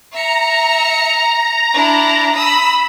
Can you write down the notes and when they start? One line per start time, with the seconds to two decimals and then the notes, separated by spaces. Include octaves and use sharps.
0.13 E5 A#5 C#7
1.74 D4 E4
2.36 B5 D#6 E6